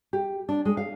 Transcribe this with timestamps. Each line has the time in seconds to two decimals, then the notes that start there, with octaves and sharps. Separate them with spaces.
0.13 G4
0.49 D4
0.65 G#3
0.77 F5